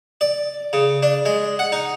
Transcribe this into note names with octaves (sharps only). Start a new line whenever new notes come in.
D5
C#3
D4
G#3
F#5
D#4